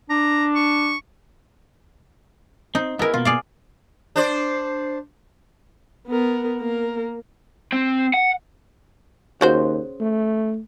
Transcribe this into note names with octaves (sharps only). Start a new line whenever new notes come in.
D4 A#5
C#6
C4 D#4
B3 D#4 E4 G#4 A#4
B2 A#3 F4
G#4 D5 F5
D4 C5 D5
B3 A#4
A#3 A#4
C4
F#5
D#2 C#3 F#4 C5
A3